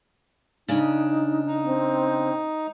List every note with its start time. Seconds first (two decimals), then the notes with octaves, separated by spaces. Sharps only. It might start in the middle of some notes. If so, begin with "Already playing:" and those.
0.68 C#3 D4 D#4
1.47 D#4
1.64 C4